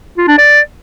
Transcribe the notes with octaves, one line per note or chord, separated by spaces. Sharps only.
F4
D4
D5